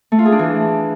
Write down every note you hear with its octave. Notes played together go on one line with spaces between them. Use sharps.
A3
F4
G#4
D4
E3